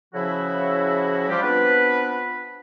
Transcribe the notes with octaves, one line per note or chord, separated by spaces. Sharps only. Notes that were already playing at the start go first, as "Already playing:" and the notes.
C#3 F3 E4 F#4
F3 G3 F4 G4
B3 C4 D4 F4 B4